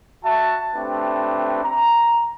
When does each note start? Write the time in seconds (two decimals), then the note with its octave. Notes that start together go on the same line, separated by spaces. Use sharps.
0.24 F#4 E5 A5
0.75 A3 C4 D4 E4 G4 B4
1.63 A#5